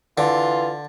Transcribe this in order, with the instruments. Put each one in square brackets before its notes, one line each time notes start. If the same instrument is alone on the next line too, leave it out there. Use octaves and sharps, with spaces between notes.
[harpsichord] D3 [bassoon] E3 [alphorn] F4